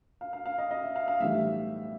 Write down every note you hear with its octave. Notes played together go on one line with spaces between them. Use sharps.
F5
F5
F5
D#5
D#5
E5
F5
F5
B1 A2 E3 G3 E5